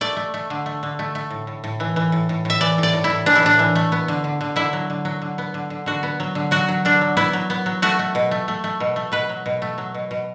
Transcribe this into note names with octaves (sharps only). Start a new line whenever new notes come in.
A3 D5
A3
A3
D3
A3
D3
A3
A3
A2
A2
A2
E3
E3
A2
A2
A2 E5
E3 D5
A2 D5
A2
E4
A2
E3 D4
E4
A2 D4
E3
A3
B3
D3
D3
D3
D3 E4
F#3
D3
F#3
D3
B3
D3
D3
D3 F#4
B3
F#3
D3
F#3 F#4
F#3
D3 D4
F#3
B3 E4
F#3
B3
F#3
A3 F#4
A3
B2
A3
A3
A3
B2
A3
B2 B4
F#3
B2
A3
F#3
B2
B2